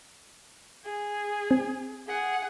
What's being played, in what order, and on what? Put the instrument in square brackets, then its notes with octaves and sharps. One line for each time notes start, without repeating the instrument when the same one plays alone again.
[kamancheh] G#4
[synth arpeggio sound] C4
[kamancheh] G#4 F#5